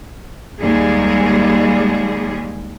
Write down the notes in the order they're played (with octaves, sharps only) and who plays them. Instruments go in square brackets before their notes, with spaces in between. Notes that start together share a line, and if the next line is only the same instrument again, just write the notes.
[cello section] D#2 G3 G#3 G#4